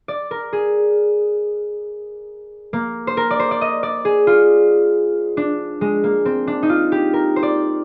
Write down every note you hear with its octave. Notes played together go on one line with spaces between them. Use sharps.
D5
A#4
G#4
A#3
C5
A#4
D5
C5
D5
D#5
D5
G#4
F4
D4
G#3
A#3
C4
D4
D#4
F4
G4
A#4
C5
D5